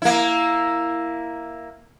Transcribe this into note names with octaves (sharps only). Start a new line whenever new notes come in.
A#3 E4